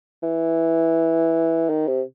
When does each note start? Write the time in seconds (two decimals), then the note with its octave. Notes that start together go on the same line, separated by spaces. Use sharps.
0.23 E3
1.69 D#3
1.87 C3